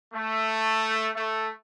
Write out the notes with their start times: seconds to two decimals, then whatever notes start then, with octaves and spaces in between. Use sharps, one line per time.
0.13 A3
1.14 A3